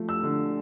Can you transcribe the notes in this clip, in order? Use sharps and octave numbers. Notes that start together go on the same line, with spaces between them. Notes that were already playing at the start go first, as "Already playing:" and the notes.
Already playing: F3 A3
E6
D3